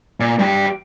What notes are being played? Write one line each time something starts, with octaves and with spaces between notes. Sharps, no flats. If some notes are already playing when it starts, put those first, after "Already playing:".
A#2
G2 G4